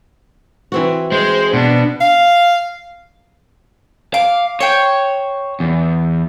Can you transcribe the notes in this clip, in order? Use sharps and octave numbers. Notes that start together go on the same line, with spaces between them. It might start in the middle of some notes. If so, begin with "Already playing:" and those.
E3 C4 F#4
G#3 C5
B2 D4
F5
F5 D6
C5 C#5 G5
E2